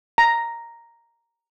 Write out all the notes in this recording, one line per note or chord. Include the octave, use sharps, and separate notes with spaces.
A#5